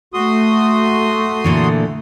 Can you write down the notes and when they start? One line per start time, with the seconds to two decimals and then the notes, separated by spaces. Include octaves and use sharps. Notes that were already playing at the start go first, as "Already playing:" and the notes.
0.14 A3 F#4 C6 D#6
1.44 A#2 D3 E3